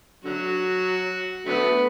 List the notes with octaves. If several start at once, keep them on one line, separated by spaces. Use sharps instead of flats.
D3 F#3 F#4
D3 F#3 A3 B3